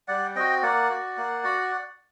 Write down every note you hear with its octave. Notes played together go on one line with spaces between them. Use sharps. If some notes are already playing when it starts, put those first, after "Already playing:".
G3 D5 F#5
C4 F#4 D#5 G5
A#3 D5 F#5
F#4
A#3
F#4